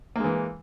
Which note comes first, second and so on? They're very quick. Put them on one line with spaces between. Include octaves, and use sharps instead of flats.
A#3 G#3 E3